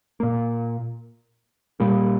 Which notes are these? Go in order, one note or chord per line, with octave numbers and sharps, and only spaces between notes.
A#2 A#3
A#2 G3 A#3